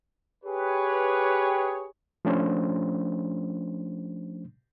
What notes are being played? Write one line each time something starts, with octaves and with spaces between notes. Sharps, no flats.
G4 G#4 B4 C#5
F3 A3 C#4 D4 C5